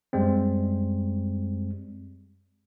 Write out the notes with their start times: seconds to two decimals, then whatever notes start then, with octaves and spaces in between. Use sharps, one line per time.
0.13 F#2 G3 G#3 C4